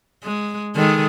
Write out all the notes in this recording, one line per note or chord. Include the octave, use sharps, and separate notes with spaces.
G#3
D#3 G#3 A4